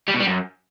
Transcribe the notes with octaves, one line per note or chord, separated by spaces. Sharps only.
G3
B2
G3
F#2